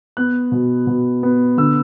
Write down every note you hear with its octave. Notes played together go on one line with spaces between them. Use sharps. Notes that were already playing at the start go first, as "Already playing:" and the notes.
B3 F#6
B2
B2
B3
D3 E6